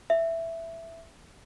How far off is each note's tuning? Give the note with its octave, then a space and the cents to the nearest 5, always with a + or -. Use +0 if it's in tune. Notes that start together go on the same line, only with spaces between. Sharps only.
E5 +5